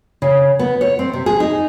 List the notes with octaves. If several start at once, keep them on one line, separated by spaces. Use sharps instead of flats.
C#3
B3
C#5
C4
C3
G#4
D#4